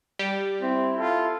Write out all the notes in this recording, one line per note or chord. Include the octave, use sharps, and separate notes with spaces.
G3 G4
C4 E4
F4 A4